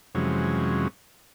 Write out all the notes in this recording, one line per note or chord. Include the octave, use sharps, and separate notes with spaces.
F2 C3 E3 F#3 G#3 C#4